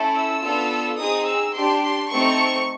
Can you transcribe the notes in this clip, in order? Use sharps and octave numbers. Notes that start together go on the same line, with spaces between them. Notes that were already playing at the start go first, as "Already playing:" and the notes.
Already playing: A3 C#4 E4 A4
E6
B3 D4 F4 A4
C4 D#4 G#4 D#6
E6
D4 G4 C6
C6
A3 C4 D#4 C#6